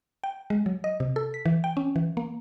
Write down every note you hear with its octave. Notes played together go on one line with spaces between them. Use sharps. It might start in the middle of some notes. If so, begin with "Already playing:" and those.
G5
G#3
F#3
D#5
C3
A4
B6
E3
G5
C#4
E3
A#3